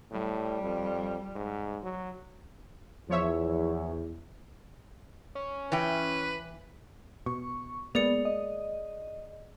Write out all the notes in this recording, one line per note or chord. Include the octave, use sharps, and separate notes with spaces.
A2 G3
F2
G#2
F#3
E2 F3 C#5 E5
C#4
E3 B4 G5
B2 C#6
G#3 A#3 B3 G#4 D5 C#7
D#5